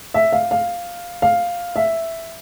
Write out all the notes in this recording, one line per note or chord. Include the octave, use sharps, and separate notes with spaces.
E5
F5
F5
F5
E5